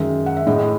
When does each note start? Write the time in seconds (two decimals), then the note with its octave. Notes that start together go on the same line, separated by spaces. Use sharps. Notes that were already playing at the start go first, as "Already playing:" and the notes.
Already playing: F#2 D#3 G#3 E5
0.26 F#5
0.37 E5
0.47 A2 G#3 D#5